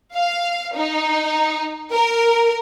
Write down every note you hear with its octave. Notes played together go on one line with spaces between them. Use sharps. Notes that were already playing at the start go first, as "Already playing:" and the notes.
F5
D#4
A#4